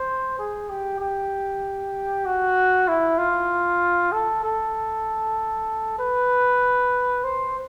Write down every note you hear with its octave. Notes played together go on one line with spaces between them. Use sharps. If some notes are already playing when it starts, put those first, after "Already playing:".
Already playing: C5
G#4
G4
G4
F#4
E4
F4
A4
A4
B4
C5